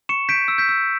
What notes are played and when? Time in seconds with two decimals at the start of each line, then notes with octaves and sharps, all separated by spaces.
0.09 C#6 C#7 E7
0.29 G6 B6 D7
0.48 E6
0.58 G6 B6
0.69 E6